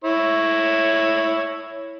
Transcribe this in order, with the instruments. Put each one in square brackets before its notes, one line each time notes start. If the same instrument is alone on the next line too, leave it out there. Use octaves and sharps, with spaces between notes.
[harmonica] E4 C#5